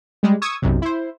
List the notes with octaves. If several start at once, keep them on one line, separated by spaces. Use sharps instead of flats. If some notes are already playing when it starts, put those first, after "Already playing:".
G3 G#3
C#6 D#6 E6 G#6
B1 F#2 C3
E4 C5